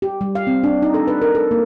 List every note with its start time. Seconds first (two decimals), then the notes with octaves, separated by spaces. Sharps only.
0.02 G4
0.21 G3
0.35 F5
0.47 C4
0.64 D4
0.82 D#4
0.94 A4
1.08 B4
1.22 A#4
1.35 A4
1.51 A#3